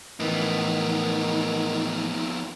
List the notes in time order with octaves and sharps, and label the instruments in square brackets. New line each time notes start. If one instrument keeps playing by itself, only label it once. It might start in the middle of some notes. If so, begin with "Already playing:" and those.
[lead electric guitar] F2 B3 [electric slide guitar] A2 E3 [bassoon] D#3 [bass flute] D#4